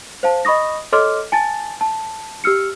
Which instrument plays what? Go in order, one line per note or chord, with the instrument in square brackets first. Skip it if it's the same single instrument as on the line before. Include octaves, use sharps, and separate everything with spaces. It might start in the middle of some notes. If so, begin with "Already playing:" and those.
[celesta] C5 F5 A5
D#5 B5 C#6 D#6 A#6
A4 C#5 D#5 C6 D6 F6
G#5 A5 A6
A5
G4 E6 F6 C#7